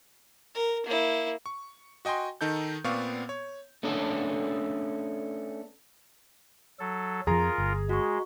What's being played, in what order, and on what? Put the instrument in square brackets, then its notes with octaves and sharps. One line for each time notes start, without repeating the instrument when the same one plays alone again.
[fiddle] A#4
A#3 E4
[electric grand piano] C#6
F#4 D#5 G5 G#5 C6
D#3 D#4 A4 G6
A#2 B3 C4 D5 F5 C#6
C#5
[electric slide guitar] A3 B3 C#4 D4 A4
[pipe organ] F#3 A4
[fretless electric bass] F2 F3 [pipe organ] F4 A#4 [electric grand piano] G#4 A#5
[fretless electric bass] G1
[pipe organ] G#3 [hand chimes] F#4 C#6